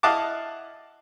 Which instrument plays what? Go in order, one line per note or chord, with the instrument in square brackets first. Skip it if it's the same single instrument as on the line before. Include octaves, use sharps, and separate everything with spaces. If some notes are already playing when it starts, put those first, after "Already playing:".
[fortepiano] E4 D#5 F5 F#5 A5 D6